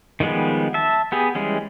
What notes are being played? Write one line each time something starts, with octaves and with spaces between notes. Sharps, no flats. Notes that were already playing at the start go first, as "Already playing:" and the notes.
D#3 F3 G3 G#3 B3
E5 A5
B3 G4 G#4
E3 G3 G#3 C#4